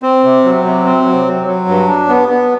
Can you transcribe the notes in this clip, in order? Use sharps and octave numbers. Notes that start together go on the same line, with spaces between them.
C4
C3
F#3
C3
C4
F#3
F#3
F#3
G2
D4
B3
B3